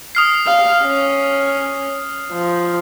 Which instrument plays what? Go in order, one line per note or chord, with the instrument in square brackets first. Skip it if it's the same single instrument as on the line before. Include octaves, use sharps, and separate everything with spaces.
[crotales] D#6 F6 C7
[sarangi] F5
C#4
F3